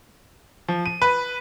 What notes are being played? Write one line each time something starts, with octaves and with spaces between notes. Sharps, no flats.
F3
D#7
B4